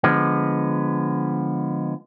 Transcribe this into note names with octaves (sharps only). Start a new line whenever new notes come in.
D3 F3 G#3 B3